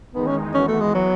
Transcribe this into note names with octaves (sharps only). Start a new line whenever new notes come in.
E2 D#3 G#3 B3 D#4
C#4
E3 B3 C#4 F#4
A3
G#3
F#3